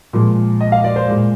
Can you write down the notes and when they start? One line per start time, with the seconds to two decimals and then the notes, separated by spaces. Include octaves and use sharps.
0.13 A#2 F3 G#3
0.61 D#5
0.72 F5
0.84 D5
0.96 C5
1.08 A#2 G#3